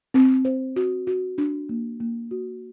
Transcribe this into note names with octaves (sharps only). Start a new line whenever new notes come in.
C4
C5
F#4
F#4
D4
A#3
A#3
F#4